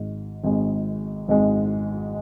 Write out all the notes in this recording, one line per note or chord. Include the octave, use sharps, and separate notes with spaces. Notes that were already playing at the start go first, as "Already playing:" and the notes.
Already playing: G#1 G#2 G#3
G#1 G#2 G#3
G#1 G#2 G#3